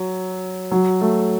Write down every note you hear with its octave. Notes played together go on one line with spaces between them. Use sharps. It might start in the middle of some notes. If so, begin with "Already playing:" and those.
Already playing: F#3
F#3
A3